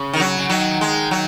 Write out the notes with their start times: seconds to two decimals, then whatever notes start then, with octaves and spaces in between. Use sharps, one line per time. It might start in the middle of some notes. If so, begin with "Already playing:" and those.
Already playing: C#3
0.13 D#3
0.20 F#3
0.39 C#3
0.50 D#3 F#3
0.81 G#3
1.11 F#3